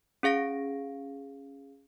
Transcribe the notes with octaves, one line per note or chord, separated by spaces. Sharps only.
C#4 G#4 F5 A#6 D7